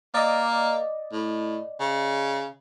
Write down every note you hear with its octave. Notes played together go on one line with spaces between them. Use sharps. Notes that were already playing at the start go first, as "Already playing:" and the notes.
A#3 D5 D#5
A2
C#3